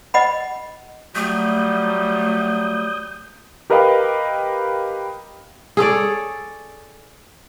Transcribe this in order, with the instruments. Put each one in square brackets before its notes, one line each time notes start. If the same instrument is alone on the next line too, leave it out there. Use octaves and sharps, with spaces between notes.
[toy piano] D#5 F#5 B5
[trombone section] F#3 G3 [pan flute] A3 [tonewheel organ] D#6 G6
[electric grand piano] G4 A#4 B4 D#5 F5 G5
[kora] G#4 A4 C#5 D5